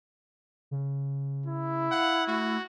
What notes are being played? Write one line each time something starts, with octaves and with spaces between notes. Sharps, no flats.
C#3
E4
F5 F#5
A3 F#4